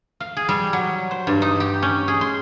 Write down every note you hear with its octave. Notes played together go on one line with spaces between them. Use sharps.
F5
G#4
G3
F#3
C5
G2
D#4
G4
C#4
G#4
C6